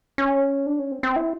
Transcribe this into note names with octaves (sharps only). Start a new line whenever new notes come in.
C#4
D4
C#4
C4
C4
E4